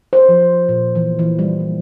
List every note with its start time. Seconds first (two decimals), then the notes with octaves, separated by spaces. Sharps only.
0.13 C5
0.29 F3
0.69 A#2
0.95 E3
1.19 E3
1.39 G3
1.60 A#3